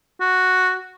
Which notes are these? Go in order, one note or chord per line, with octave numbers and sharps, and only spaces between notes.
F#4